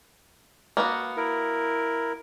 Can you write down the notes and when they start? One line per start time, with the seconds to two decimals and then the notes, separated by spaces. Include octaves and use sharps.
0.77 A#3 B3 F#4
1.17 E4 A#4